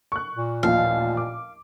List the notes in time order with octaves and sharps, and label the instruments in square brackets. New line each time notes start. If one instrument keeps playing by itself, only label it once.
[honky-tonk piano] C#6 F#6
[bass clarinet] A#2
[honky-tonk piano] A1 D#2 F3 [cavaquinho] F5
[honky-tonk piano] D6